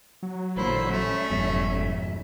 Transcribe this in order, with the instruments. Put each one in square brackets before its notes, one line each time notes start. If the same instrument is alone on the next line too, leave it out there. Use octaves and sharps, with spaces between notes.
[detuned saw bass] F#3
[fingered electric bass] A1 A#2 [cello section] D3 A#3 C5 [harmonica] E4
[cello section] G3 C#4 E5 [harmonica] A3
[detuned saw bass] F#1 [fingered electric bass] F2 G#2 B2